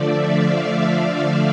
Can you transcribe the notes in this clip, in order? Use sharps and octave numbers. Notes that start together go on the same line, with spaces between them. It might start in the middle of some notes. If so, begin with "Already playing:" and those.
Already playing: D3 F3 A3 D5 E5
F5